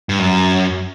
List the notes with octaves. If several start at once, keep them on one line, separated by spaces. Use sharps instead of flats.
G2
F#2